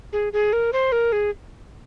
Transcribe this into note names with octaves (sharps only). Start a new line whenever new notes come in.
G#4
G#4
A#4
C5
A#4
G#4